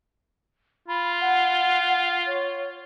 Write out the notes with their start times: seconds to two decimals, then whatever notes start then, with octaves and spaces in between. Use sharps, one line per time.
0.88 F4 B5
1.21 F#5
2.27 C#5